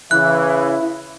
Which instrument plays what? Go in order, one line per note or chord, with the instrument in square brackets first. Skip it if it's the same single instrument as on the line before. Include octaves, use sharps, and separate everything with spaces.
[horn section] C#3 E3 [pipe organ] E4 [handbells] F#6